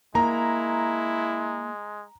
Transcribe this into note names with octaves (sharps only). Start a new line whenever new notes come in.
G#3 A#3 E4 A#5